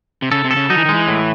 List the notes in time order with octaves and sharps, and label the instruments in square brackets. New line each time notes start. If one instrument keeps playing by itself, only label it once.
[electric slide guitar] C3
[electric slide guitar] C#3 [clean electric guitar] A4
[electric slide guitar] C3
[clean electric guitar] A4
[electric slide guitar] C#3
[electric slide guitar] F#3 [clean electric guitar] D#4
[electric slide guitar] E3
D#3
[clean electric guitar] G#3
[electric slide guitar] E3
[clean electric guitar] A2